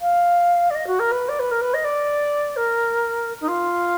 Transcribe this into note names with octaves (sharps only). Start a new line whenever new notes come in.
F5
D5
D#5
F#4
A#4
B4
D5
B4
A#4
B4
D#5
D5
A#4
D#4
F4